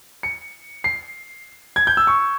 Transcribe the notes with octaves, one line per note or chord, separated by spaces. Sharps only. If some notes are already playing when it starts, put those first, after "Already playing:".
C#7
C7
G#6
G6
E6
C#6